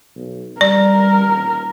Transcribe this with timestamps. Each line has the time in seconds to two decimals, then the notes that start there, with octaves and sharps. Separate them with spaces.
0.15 B1
0.61 G3 A#4 D5
1.27 D#1